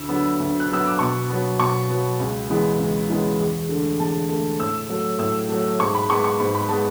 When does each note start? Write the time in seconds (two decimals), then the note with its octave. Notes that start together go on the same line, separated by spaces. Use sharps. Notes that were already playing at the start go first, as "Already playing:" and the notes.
Already playing: D2 E6
0.09 D3 F#3 B3
0.40 D2
0.60 F#6
0.69 D3 F#3 B3 E6
0.86 D6
0.99 B2 C#6
1.29 F#3 B3
1.59 B2 C#6
1.90 F#3 B3
2.20 C#2
2.49 C#3 E3 G#3 B3
2.79 C#2
3.09 C#3 E3 G#3 B3
3.39 E2
3.69 D3 A3
3.99 E2 A5
4.29 D3 A3
4.59 A2 E6
4.89 F#3 A3
5.19 A2 E6
5.49 F#3 A3
5.79 G#2 C#6
5.95 B5
6.09 G#3 B3 C#6
6.24 C#6
6.40 G#2 B5
6.55 B5
6.69 G#3 B3 A5